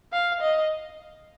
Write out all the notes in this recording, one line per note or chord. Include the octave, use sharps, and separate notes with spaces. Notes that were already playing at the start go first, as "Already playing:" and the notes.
F5
D#5